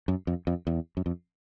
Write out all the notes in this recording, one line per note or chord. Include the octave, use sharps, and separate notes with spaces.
F#2
F2
F2
E2
F#2
F2